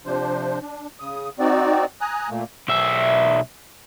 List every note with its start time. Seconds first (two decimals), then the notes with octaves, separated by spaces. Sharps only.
0.06 C3 F3 D4 C5
0.62 D4
1.00 C#3 D#6
1.39 C4 D#4 F#4 D5
2.01 G#5 A#5 D#6 F#6
2.30 A#2 A3 A#3
2.68 B1 E5